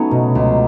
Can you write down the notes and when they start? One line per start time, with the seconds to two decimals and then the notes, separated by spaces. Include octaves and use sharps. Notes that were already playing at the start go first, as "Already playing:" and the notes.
Already playing: F#3 A3 B3 C#4 D#4
0.11 B2
0.35 C#2